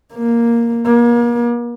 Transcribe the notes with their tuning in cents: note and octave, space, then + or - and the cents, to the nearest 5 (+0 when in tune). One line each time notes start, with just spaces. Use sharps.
A#3 +0
A#3 +35